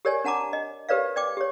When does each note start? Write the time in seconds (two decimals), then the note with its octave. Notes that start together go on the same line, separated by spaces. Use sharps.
0.05 G4 A#4 C#5 D5 G#5
0.24 D4 F#5 A5 A#5 D6
0.53 D#5
0.89 G4 A#4 B4 C#5 D5 F5
1.16 D5 G5 D6
1.37 G4 C#5